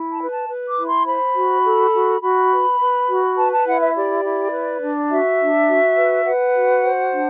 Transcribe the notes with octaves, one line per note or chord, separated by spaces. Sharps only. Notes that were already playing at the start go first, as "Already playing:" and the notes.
Already playing: E4
A5
B4
A5
B4
D6
E4
C6
C5 B5
F#4
A4
F#4
F#4 B5
B4
B4
F#4
B4 A5
A5
E4 F#5
E5
G4 D5
E4
B4
D4
F#4 E5
D4
F#4
B4
B4 F#5
F#4
C5
D4